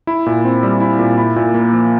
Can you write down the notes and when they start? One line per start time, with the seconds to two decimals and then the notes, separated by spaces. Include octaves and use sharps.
0.07 E4
0.26 A#2
0.45 C4
0.63 G3
0.80 E4
0.99 A#2
1.18 E4
1.36 A#2
1.54 A#3
1.73 F3